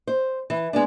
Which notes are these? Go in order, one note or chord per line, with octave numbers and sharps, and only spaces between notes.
C5
E3
G#3 B3 D4